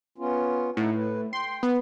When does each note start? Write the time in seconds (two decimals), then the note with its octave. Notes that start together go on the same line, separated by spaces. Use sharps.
0.18 B3 C#4 F4
0.77 A2 D#4 F#5
0.96 B4
1.33 G5 C6
1.63 B3